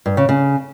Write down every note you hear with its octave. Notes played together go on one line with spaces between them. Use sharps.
G2
C#3
C#3